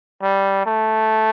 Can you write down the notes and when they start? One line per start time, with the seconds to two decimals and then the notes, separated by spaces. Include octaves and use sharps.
0.22 G3
0.66 A3